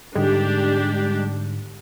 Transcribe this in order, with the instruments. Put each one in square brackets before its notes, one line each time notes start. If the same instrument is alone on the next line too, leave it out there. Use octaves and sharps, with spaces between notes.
[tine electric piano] G#2 D3 [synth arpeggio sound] G3 G#3 [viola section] D4 G4